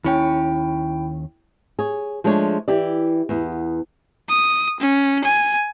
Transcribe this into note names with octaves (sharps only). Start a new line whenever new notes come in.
D#2 C#4 E4 G5
G#4 C#5
F3 G#3 A3 D4 C#5
E3 E4 G4 D5
E2 B3
D#6
C#4
G#5